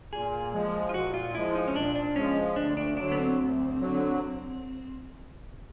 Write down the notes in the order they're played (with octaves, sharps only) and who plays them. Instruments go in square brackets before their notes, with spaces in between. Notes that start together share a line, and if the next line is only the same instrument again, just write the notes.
[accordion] A#2 [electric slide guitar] G#4
[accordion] F3 G#3
[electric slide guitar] F4
[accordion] A#2 [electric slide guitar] F#4
[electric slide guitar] F4
[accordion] F3 G#3 [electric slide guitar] E4
[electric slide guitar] D#4
C#4
[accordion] A#2 [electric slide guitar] D4
[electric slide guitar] D4
[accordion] F3 G#3 [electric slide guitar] C#4
[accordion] D2 [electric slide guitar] D4
[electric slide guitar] D4
[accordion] D3 F#3 [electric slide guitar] D4
[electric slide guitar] B3
C4
[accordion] D2
D3 F#3